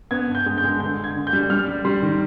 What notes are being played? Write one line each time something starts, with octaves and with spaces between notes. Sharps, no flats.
B3 G#6
G2
G6
G#3
G6
G#3
D3 G6
D3
G#6
D3
G6
G3
G3 F6
G3
G3 C6
D#3